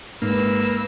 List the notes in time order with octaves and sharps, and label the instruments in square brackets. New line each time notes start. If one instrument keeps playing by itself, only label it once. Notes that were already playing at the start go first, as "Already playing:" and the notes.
[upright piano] G#2 [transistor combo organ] A#3 [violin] B4 E6